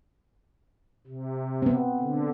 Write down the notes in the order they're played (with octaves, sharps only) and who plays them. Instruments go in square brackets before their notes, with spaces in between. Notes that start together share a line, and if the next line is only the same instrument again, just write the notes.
[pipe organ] C3
[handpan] B3 C4
[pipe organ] D3